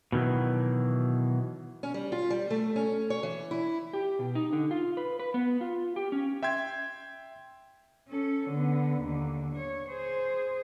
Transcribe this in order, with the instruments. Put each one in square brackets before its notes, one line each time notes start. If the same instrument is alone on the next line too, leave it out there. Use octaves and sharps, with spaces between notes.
[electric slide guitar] B2 D#3 E3 F#3
[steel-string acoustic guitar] C#4
G3
F4
G3
A3
C#4
C#5
E3
E4
[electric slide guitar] G4
B2
D#4
D3
F4
B4
B4
B3
F4
G4
C#4
[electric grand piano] E5 G5 C6 G#6
[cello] C#4 A4
D3 B3
D#2 D3
C#5
G#4 C5